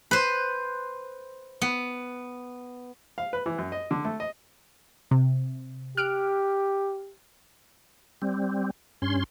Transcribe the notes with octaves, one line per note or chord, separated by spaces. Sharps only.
B4 C5
B3
F5
B4
E3
F#2
D#5
D3
A3
D#5
C3
G4 F6 F#6 D7
G3 C4
G2 C#4 C6